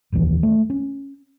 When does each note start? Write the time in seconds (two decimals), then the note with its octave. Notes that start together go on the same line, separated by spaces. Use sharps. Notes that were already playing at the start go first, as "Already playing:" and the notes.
0.12 F1 A#1 D#2 E3
0.43 A3
0.70 C#4